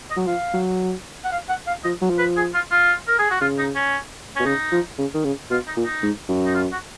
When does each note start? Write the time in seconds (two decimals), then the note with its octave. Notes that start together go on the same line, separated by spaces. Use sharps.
0.10 D#5
0.16 F#3
0.27 F3 F5
0.54 F#3
1.24 F#5
1.32 F5
1.49 F#5
1.67 F5
1.84 F3 D#5
2.01 F#3
2.10 F3
2.18 B4
2.37 G#4
2.54 F4
2.71 F4
3.08 A#4
3.19 G#4
3.31 F#4
3.41 C#3 F4
3.58 D#4
3.75 C#4
4.36 B2 C#4
4.46 C#3 D#4
4.72 F3
4.98 C#3
5.14 D#3
5.24 C#3
5.50 B2 F4
5.68 D#4
5.76 A#2
5.85 D#4
6.03 G#2
6.29 F#2
6.46 D#4
6.54 F4
6.72 F#4